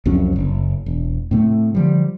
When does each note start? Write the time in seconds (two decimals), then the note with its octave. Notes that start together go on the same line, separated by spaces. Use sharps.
0.06 C2 F2 F#3 C#4
0.36 F#1
0.86 E1
1.31 A2 C3 A3
1.75 D3 F3 G3